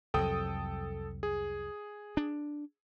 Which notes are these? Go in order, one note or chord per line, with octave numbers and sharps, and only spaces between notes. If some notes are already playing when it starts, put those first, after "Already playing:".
C2 F2 F#3 A4 G5 D#6
G#4
D4